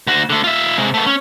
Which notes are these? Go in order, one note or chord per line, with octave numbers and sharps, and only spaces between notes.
D2 F#4
D3 A3
F4 E5
C3 G#3
A3 B3
C#4